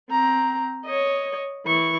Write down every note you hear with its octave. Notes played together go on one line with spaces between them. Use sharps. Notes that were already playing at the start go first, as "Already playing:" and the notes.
C4 A#5
C#5 D#5
E3 C#6